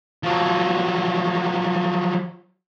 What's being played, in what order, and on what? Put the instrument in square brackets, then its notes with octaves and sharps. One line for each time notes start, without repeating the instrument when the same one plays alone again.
[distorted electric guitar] F3 F#3